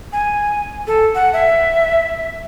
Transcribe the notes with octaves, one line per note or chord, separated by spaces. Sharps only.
G#5
A4
F#5
E5